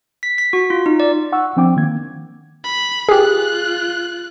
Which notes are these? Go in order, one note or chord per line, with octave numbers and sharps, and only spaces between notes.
B6
B6
F#4
F4
D#4
D5
F#5 C#6 E6
F3 C4 D4 G5 D6
D#3 A#3 G#6
B5
F4 G4 G#4 F#6